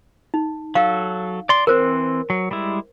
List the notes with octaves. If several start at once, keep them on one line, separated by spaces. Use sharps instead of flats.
D#4
F#3 A4 F5
D5 C6
E3 C4 A#4 C5
F#3
G3 G#3 E4